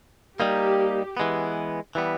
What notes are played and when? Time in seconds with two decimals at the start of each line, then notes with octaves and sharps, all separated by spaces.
0.39 G3 A#3 D#4 G4
1.17 E3 G#3 B3
1.95 E3 G3 B3